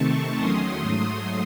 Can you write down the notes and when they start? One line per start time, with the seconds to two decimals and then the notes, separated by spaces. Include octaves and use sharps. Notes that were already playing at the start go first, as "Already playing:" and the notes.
Already playing: C3 D#3 A3 C4 A5 C#6
0.36 E2 D#3 F#3 A3 C#4 C6 D#6
0.81 G#2 F#3 A3